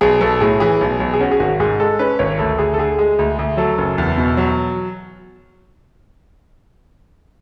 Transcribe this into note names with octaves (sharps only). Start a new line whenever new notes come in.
B1 G#4
B1 A4
A2 G#4
E3 G#4
B1
B1
G#4
C#4 F#4
G#4
G#1 F#4
G#2 G#4
G#3 A4
C#4 B4
G#1 C#5
D2 A4
D2 G#4
A4
D3 G#4
G#3 G#4
D2
D2
F#3 A4
F#1
E2
B2
F#3